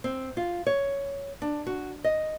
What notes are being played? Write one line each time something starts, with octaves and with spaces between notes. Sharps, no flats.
C4
F4
C#5
D4
F#4
D#5